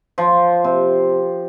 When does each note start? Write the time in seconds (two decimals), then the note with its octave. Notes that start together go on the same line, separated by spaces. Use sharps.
0.18 F3
0.64 C3